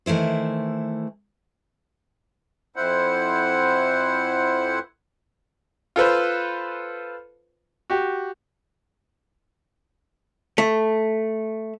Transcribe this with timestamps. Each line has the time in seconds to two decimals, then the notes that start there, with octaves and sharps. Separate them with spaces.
0.06 D#3 E3 A3 E4 C5
2.76 F2 E4 C5 F#5
5.96 F4 A4 B4 C5
7.90 F#4 G4
10.58 A3